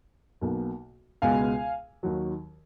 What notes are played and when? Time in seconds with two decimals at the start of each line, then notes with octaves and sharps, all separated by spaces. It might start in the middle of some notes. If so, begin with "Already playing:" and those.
0.41 B1 B2 A#3
1.22 C#2 B2 G#3 B3 F5 G#5
2.03 D#2 D#3 F#3